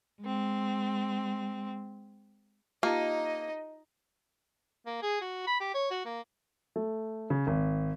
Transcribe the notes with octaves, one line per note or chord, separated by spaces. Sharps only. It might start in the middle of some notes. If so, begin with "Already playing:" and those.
G#3 C4
A#3 D#4 F4 G4 D#5 A5
A#3
G#4
F#4
B5
G4
C#5
F#4
A#3
A3
C#3
G#1